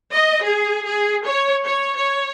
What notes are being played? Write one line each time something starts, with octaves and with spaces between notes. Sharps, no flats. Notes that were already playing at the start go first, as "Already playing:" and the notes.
D#5
G#4
G#4
C#5
C#5
C#5